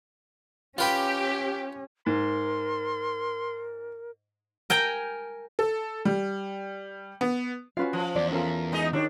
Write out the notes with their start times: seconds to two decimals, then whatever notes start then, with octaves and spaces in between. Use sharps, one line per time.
0.78 C#4 F4 G4 B4 G5
2.06 G#2 A#4 C6
4.70 A#4 G5 G#5 A#5
5.59 A4
6.05 G3
7.21 B3
7.77 C#4 F4 F#4 B4 F5
7.93 F3
8.16 E2 D5
8.31 C#4 F4 A4 A#4
8.72 G#3 D#4 D#5
8.93 D#3 D4 D#4 G4 C#5